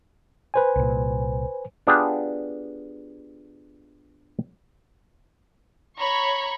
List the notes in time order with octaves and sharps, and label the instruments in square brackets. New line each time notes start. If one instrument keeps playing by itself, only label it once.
[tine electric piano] B4 C5 G#5
[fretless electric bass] C2 A#2
[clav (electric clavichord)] B3 D4 F4 G4 G#4
[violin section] C#5 A#5 B5 C#6